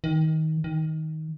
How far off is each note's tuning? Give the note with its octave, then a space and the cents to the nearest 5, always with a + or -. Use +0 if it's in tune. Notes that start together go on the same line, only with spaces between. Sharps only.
D#3 +20
D#3 +15